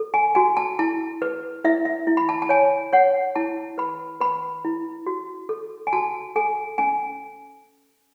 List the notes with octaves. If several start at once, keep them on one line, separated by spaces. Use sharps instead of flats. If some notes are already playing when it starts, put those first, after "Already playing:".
Already playing: A4
G#5
F#4 G#5
A5
E4 A5
B4
E4 E5
E5
E4
B5
A5
A5
C#5 G#5
C#5 F#5
E4 A5
B4 B5
B4 B5
E4
F#4
A4
G#5
F#4 A5
A4 G#5
C#4 G#5